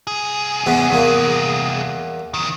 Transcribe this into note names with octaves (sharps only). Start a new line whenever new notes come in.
C2 G#4
E2 B3
E2 A#3
E2 D#3